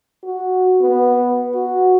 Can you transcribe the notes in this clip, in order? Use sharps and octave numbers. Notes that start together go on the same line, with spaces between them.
F#4
B3
F#4